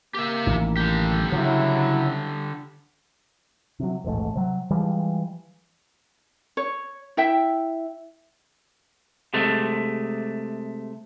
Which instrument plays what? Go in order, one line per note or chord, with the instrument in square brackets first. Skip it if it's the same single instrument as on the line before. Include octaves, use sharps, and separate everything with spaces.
[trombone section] A#3 [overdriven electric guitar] G4 E5
[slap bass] A1 D#3
[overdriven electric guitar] D3 G4
[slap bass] C#3 [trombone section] F#3 E4
[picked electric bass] C3 F#3
D#1 A1 G#2 A3
C3 F#3
E3 F3 G3 G#3
[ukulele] C#5
E4 E5 G5
[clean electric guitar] C3 G#3 A3